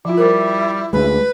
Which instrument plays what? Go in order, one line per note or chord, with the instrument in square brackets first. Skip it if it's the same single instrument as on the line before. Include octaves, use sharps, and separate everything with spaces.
[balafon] F3 F4 [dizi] E4
[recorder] G3 [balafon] A#4 C5
[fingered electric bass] D2 G#3 [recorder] B4